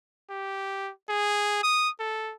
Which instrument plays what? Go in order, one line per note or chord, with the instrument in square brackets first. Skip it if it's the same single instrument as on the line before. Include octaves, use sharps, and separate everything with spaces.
[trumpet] G4
G#4
D#6
A4